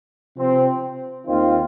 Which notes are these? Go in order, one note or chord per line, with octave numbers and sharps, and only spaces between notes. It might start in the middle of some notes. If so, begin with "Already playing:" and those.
C3 F3 C4
D#2 D#3 C4 F4